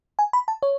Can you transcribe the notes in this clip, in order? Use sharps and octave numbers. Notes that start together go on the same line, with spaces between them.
G#5
B5
A5
C#5